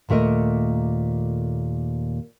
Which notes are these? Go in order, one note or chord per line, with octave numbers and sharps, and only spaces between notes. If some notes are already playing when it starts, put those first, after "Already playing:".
D#2 A#2 A3 A#4 D#5